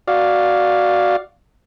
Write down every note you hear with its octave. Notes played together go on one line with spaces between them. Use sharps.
F#4 D5 F5